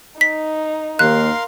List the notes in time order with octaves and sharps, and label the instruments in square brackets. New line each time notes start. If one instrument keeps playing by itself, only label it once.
[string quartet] D#4 [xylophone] B6
[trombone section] D#2 [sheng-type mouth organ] A#4 F5 C6 [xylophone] F#6